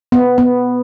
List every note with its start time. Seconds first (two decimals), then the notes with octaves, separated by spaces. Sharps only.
0.12 B3
0.38 B3